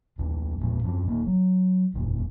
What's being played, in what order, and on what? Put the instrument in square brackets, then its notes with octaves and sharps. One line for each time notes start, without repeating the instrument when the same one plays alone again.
[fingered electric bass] D#2 C3 A3
E2 A#2 F3 G#3
F#2 F3 C4
D#1 D#3 A#3
F#3
F1 D#2 A#2 D#3